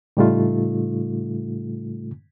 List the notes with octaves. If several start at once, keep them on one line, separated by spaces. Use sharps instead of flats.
A2 C#3 G3 A3 D#4 F4